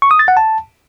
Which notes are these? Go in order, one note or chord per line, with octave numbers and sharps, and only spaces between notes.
C#6
D#6
A6
F#5
A5